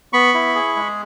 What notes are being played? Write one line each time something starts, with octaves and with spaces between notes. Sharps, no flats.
B3 B5 C#6
E4
G#4
G#3